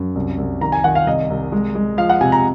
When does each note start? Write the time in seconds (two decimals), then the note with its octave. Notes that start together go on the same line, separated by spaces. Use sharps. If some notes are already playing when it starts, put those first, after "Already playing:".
Already playing: F#2
0.15 C2
0.38 C2
0.61 D#3 A#5
0.72 G#5
0.84 D#3 F#5
0.95 F5
1.06 C2 D#5
1.30 C2
1.52 G#3
1.75 G#3
1.98 F3 F5
2.09 F#5
2.21 C3 G#5
2.32 A#5